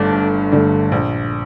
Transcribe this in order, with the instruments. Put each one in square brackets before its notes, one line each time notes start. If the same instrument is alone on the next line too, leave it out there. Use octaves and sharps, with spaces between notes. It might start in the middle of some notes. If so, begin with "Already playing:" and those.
Already playing: [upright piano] G1 G2 D3 A3 [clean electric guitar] D4
[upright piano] G1
G2 D3 A3
A#1